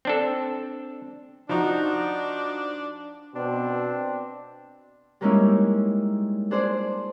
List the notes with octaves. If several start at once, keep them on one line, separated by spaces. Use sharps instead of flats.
C4 D4 A4
F3 D4 D#4 F#4
B2 C4 D4
G3 G#3 A#3 C#4 D#4 E4
D4 G#4 C5 D5